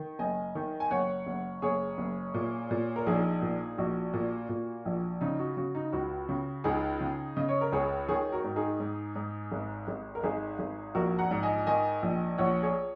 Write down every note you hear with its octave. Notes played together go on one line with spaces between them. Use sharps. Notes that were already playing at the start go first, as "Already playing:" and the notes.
Already playing: D#3
F#1 D#5 G#5
D#3
G#5
F#1 C#5 F#5
F#1
F#1 G#4 C#5
F#1
A#2
A#2
A#4
A#1 D#4 G#4
A#2
A#1 F#4
A#2
A#2
A#1
C#3 D#4
F#4
C#3 F#4
D#4
C#2 F#4
C#3
C#2 D#4 G#4
C#3
C#3 D#5
C#5
A#4
C#2 G#4 C#5
D#3 G#4 C#5
F#4 A#4
G#2
D#4 G#4
G#2
G#2
G#1
G#1
A#4
G#1 D#4 G#4
G#1
A#1 F#4 A#4
F#5 A#5
G#2
D#5 G#5
D#3 D#5 G#5
A#1
A#1 C#5 F#5
G#4 C#5